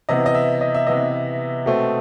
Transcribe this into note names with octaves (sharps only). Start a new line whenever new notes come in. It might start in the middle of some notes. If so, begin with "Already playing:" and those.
C3 E3 B3 D#5
D#5
E5
D#5
E5
C3 E3 B3 D#5
B2 A3 C4